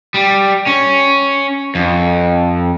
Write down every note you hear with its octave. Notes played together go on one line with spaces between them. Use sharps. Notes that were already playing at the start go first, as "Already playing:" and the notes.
G3
C#4
F2